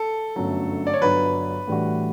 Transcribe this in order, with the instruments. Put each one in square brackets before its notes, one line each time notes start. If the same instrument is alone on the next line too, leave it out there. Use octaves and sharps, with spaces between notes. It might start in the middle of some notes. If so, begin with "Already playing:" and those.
Already playing: [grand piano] A4
[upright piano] G1 F#2 D3 F#3 A3
[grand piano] D5
C#5
[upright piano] G1 G2 F#3 [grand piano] B4
[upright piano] A2 E3 G3 D4 F#4